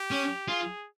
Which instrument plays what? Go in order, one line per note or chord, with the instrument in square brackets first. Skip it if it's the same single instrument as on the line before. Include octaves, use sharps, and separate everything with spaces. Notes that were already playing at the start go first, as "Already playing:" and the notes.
Already playing: [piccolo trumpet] G4
[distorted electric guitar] C#4
[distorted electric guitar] F4 [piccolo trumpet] G#4